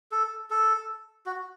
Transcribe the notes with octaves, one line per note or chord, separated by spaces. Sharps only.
A4
A4
F#4